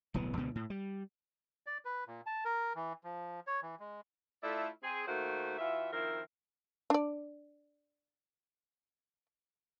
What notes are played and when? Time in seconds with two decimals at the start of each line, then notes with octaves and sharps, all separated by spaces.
0.14 D1 B1 E3 B3
0.37 C#2 B2 D3 B3
0.55 A2
0.70 G3
1.66 D5
1.85 B4
2.07 A#2
2.26 A5
2.45 A#4
2.75 E3
3.04 F3
3.47 C#5
3.62 E3
3.80 G#3
4.42 A3 E4 F4 A4 D5
4.83 C4 G#4
5.07 D#3 A3 A#3 F#4 C5
5.58 E3 F4 F#4 E5
5.92 D#3 F3 C4 E4 A#4
6.90 D4 D5